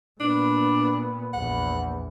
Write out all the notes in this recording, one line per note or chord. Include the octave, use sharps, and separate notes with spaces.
A#2 B3 D4
A#1 E2 F#5